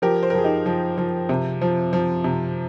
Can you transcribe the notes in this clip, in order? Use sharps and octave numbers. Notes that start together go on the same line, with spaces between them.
F3 G4 A#4
C5
A#4
F3 G#4
D#4 G4
F3
F3
C3
F3
F3
C3